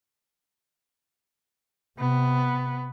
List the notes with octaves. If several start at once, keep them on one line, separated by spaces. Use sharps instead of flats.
C3 B3